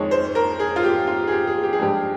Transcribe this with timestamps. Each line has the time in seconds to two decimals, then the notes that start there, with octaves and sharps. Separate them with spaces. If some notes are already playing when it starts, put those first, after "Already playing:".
Already playing: F2 D#3 G#3 C#5
0.11 C5
0.35 A#4
0.59 G#4
0.76 F4
0.83 G4
1.07 F4
1.27 G#4
1.32 G4
1.47 G#4
1.63 G4
1.73 G#4
1.79 G2 F3 G#3 G4